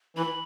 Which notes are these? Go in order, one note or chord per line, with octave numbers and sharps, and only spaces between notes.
E3 B5